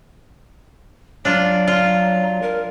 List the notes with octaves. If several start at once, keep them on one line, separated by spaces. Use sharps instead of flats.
F#3 D4 F4
F4
A#4